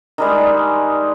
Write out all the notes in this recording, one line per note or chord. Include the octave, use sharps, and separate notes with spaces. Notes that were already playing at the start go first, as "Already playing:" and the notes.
D#3 G3 G#3